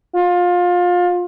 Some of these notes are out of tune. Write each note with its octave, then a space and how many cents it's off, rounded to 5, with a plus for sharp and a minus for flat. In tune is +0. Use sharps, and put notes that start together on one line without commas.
F4 +25